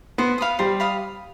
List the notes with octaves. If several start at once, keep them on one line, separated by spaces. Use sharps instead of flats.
B3 C5
F5 B5 D#6
G3 C5
F5 B5 D#6